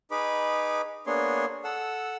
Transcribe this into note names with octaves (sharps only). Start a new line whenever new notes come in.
D#4 G#4 B4 B5 D6
A#3 B3 D4 G#4 C#5 C6
A4 F#5 E6